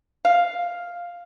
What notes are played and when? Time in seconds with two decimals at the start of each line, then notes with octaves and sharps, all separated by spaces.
0.25 F5